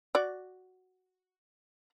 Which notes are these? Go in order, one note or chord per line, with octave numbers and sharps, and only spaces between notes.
F#4 D5